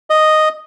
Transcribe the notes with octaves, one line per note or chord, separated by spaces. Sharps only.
D#5